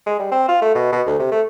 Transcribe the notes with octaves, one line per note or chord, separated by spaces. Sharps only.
G#3
G3
C4
F4
A3
B2
B2
D2
C3
A3